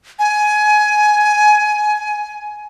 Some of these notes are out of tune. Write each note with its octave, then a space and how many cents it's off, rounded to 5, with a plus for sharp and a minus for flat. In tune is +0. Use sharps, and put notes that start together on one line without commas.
G#5 +20